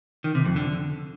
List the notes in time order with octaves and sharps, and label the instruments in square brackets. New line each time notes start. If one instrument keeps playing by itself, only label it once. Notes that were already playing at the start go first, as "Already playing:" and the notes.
[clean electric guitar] D#3
C3
F2
D3